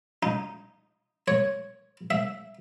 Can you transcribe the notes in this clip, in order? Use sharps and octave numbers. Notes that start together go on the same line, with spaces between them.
D#4
C#5
E5